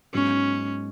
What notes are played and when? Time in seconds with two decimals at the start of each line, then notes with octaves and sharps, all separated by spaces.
0.13 G#2 F#3 B3 C#4